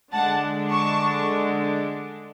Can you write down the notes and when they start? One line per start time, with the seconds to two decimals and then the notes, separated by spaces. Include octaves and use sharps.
0.12 D3 G#3 D4 F#5 A5
0.71 A5 C#6